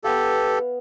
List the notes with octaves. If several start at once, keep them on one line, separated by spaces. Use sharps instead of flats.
B3 G4 A4 F5